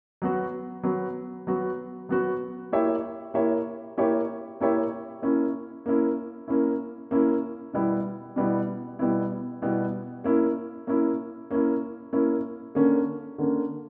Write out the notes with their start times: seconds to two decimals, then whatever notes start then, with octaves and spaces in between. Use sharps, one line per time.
0.22 F#3 B3 F#4
0.83 F#3 B3 F#4
1.47 F#3 B3 F#4
2.09 F#3 B3 F#4
2.72 A#3 E4 G4 C#5 E5
3.34 A#3 E4 G4 C#5 E5
3.97 A#3 E4 G4 C#5 E5
4.60 A#3 E4 G4 C#5 E5
5.22 A#3 C#4 E4
5.86 A#3 C#4 E4
6.48 A#3 C#4 E4
7.11 A#3 C#4 E4
7.73 B2 G3 B3 E4
8.36 B2 G3 B3 E4
8.99 B2 G3 B3 E4
9.62 B2 G3 B3 E4
10.24 A#3 C#4 E4
10.87 A#3 C#4 E4
11.51 A#3 C#4 E4
12.13 A#3 C#4 E4
12.75 D3 A#3 C#4
13.38 D3 A#3 C#4